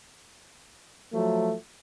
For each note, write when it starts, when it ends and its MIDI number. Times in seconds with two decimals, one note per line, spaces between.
1.13 1.53 53
1.13 1.53 54
1.13 1.53 57